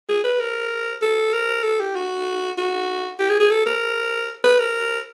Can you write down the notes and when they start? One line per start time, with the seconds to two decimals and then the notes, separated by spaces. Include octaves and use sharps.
0.09 G#4
0.24 B4
0.40 A#4
1.02 A4
1.33 A#4
1.63 A4
1.80 G4
1.95 F#4
2.58 F#4
3.19 G4
3.29 G#4
3.40 G#4
3.51 A4
3.66 A#4
4.44 B4
4.59 A#4